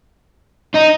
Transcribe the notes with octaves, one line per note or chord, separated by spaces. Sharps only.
D#4